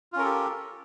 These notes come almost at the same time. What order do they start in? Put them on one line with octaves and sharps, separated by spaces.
F4 C#4 A#4 A4 G4